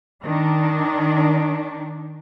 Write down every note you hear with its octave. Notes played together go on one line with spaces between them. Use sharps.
D#3 D4